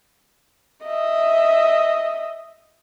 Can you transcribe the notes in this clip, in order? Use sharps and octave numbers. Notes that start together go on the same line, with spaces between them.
D#5 E5